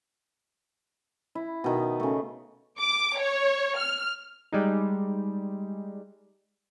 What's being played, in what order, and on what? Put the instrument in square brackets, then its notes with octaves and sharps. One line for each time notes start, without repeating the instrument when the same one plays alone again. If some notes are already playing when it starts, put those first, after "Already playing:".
[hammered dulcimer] E4
B2 D#3
C#3 A3
[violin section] D6
C#5
F6
[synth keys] G3 G#3 D#4